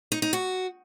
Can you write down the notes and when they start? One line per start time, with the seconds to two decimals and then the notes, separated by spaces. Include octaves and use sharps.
0.12 D#4
0.22 D#4
0.33 F#4